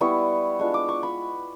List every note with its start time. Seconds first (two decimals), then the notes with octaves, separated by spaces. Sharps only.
0.01 G3 B3 E4 C#6
0.59 G#3 B3 D4 F4 C#6
0.74 D6
0.89 C#6
1.03 B5